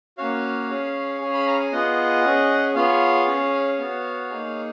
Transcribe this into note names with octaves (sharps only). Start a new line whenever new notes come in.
A#3 C#4 F#4 C#5 F5
C#4 G#4
C#4 G#4
B5
A#5
G#5
B3 F4 G#4 D#5 F#5
C#4 G#4
B3 F4 G#4 C#5 F5
C#4 G#4
B3 F#4
A#3 D#4 G#4